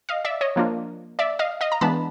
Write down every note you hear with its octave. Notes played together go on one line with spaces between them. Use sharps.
D#5 F5
D5 E5
C#5 D#5
F3 A#3 D4 F4
D5 E5
D#5 F5
D#5 F5
A#5
E3 G#3 B3 D4 A5 B5